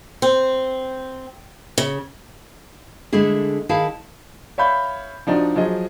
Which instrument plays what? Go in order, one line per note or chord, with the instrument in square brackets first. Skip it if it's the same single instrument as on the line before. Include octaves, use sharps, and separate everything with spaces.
[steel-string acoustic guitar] C4
C#3
[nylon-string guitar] D3 G#3 A3 E4 G#4
D#3 E4 G#4 F5 A5
[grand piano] C#5 E5 F5 B5 G6
F3 D4 D#4 F#4
F3 F#3 G#4 D#5